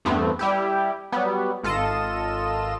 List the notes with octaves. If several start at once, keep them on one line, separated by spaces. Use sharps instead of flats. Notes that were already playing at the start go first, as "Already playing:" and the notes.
E2 G2 A3 B3 C4
G3 E4 G4
F#3 G3 B3
G#1 F4 A4 D#5 E7